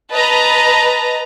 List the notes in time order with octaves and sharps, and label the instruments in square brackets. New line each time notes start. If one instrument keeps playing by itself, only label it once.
[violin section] B4 D#5 A5 A#5